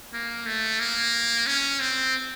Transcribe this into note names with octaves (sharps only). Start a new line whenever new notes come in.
A#3
A3
A#3
C#4
C4